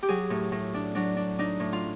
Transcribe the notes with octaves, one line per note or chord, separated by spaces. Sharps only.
G4
F#3 G#4
A2
A2
D4
F#3 D4
D4
D4 D#4
A2
F4